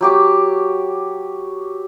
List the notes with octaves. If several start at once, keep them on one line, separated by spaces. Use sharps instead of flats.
F#3 G4 D6